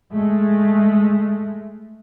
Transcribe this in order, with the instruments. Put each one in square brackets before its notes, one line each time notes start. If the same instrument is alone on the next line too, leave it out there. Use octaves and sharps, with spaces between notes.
[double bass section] G#3 A3